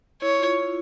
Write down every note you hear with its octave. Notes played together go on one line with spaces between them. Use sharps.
E4 C#5
F4